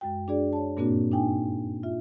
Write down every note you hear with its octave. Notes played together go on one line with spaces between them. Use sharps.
F#2 G#3 F#4 G5
D4 F#4 G#4 D5
C#5 A5
G2 A#2 A#3 C4 D4 F#4
D4 D#4 G5 G#5
F4 E5